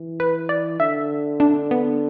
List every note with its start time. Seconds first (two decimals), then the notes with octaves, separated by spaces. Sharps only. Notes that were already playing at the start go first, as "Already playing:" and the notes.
Already playing: E3
0.20 B4
0.49 D5
0.80 D3 E5
1.40 D4
1.71 B3